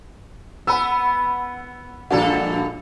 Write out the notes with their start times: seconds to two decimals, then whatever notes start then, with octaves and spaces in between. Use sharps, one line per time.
0.67 B3 F#5 B5 E6
2.10 A#1 G2 A#3 D4 F#4 A4